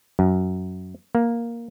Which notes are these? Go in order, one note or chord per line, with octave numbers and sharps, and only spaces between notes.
F#2
A#3